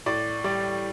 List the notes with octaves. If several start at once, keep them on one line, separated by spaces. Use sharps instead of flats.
A2 D5
G3 D5